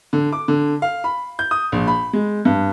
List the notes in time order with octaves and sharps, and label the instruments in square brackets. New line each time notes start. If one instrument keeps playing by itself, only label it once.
[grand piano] D3
D6
D3
F5
B5
G6
D#6
A#1
B5
G#3
G2